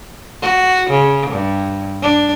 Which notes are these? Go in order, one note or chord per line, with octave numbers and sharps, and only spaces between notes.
F#4
C#3
G2
D4